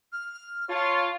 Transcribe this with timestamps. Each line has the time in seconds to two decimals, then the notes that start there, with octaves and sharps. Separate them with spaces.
0.12 F6
0.70 F4 C#5 A5